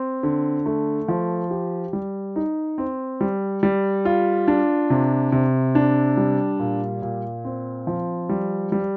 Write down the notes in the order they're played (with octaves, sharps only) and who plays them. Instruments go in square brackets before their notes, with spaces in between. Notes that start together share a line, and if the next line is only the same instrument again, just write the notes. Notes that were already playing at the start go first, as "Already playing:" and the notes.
Already playing: [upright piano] C4
D3
A3
F3
G4
G3
D#4
C4
G3
G3
F4
D4
C3
C3
D4
G3
A#2
A#2
C4
F3
G3
G3